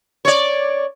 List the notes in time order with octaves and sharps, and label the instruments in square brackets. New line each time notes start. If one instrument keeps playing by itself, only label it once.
[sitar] C#5 D5